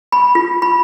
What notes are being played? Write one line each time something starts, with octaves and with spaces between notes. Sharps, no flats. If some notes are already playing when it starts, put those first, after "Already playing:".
B5
F4
B5